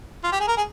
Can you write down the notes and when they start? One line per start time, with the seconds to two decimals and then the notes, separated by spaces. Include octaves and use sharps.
0.24 F4
0.32 G4
0.40 G#4
0.48 A#4
0.57 G#4